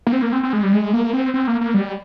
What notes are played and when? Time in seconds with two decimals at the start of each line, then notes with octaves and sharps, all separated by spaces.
0.07 A#3
0.12 C4
0.22 A#3
0.32 C4
0.43 C4
0.53 G#3
0.63 G3
0.73 G#3
0.93 A#3
1.13 C4
1.34 C4
1.48 A#3
1.61 A#3
1.74 G3